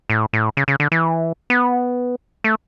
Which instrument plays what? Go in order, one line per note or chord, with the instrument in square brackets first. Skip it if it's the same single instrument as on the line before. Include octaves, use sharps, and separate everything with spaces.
[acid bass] A2
A2
C#3
C#3
D3
E3
B3
A3